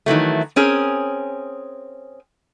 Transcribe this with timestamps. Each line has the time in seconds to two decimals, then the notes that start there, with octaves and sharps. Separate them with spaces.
0.06 D#3 E3 F#3 A3
0.56 C4 C#4 G#4 A#4